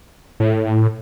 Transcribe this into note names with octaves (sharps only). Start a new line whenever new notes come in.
A2